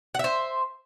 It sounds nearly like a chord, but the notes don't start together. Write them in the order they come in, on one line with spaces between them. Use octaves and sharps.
F#5 E5 C5